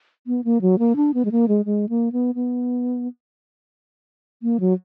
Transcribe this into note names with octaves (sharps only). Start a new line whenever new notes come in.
B3
A#3
F#3
A#3
D4
B3
G#3
A#3
G#3
G#3
A#3
B3
B3
A#3
F#3